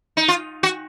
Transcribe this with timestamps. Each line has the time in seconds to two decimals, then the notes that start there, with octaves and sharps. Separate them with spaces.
0.17 D#4
0.28 F4
0.63 F#4